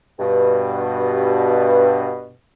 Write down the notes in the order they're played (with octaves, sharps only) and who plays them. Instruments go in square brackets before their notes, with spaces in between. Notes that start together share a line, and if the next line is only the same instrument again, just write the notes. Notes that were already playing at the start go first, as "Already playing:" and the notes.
[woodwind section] G2 B2